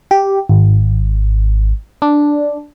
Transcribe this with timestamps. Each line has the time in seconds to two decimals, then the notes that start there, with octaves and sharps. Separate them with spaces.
0.11 G4
0.49 G#1
2.02 D4